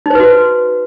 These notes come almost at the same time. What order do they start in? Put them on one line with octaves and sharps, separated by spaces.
D#4 C5 B4 F#4